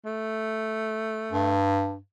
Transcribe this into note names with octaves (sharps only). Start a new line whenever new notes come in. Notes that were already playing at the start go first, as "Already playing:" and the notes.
A3
G2